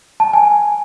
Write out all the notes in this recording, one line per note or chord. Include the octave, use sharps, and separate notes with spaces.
A5
G#5